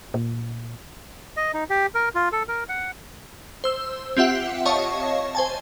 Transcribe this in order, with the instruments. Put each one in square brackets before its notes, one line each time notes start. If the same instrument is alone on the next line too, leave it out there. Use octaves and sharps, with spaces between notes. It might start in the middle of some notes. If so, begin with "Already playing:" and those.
[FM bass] A#2
[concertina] D#5
D#4
G4
A#4
F4
A4
A#4
F#5
[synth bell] C5 E6
C4 F4 G4 E5 F#5
C#5 D#5 F5 A5 C#6
C5 G#5 A5